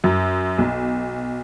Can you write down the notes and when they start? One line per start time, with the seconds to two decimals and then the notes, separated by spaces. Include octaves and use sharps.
0.04 F#2
0.58 B1